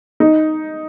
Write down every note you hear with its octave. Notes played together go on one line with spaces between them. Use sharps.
D#4